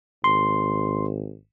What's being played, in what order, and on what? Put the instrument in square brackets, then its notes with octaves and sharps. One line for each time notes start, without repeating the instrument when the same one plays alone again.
[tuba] G#1 [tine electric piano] C6